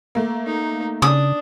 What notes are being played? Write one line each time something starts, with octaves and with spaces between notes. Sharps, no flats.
A3 A#3
D#4
C#3 D4 D#6